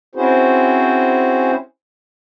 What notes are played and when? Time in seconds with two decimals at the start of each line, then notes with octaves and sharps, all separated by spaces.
0.15 C4 C#4 E4 F#4 G#4 C5